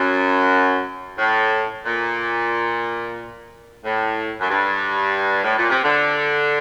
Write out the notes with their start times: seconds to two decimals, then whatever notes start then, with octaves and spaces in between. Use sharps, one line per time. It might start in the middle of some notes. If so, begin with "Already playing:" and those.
Already playing: F#2
1.18 A2
1.85 A#2
3.84 A2
4.40 F#2
4.50 G2
5.43 A2
5.57 A#2
5.70 C3
5.83 D3